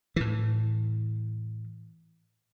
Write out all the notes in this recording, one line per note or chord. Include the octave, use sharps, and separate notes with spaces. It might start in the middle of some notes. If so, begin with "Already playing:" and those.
A2 E3